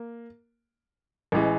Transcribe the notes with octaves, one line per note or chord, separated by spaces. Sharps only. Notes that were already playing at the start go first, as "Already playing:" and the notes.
Already playing: A#3
A1 E3 G#3